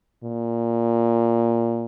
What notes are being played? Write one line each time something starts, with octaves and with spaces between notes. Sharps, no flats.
A#2